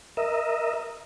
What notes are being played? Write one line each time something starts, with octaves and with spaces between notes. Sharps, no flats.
A#4 D#5 E5